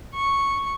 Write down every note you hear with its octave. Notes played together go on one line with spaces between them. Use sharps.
C#6